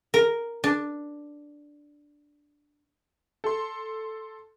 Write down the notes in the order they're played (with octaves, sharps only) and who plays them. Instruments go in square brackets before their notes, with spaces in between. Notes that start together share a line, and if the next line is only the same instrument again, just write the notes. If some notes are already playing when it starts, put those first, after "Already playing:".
[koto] A#4
D4
[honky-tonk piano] A4 C6